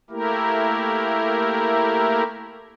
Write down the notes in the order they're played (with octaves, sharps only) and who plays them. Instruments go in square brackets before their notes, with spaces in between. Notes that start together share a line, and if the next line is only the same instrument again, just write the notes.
[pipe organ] A3 A#3 E4 G4 A#4